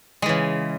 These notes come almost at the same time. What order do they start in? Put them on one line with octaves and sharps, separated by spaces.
G#3 E3 C#3